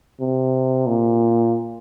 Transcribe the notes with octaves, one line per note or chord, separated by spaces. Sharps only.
C3
A#2